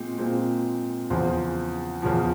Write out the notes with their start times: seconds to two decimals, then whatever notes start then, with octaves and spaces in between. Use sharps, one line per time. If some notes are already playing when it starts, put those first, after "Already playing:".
Already playing: A#2 G#3 C4
0.18 A#2 G#3 C4
1.10 E2 C#3 F3 C5
2.02 E2 C#3 F3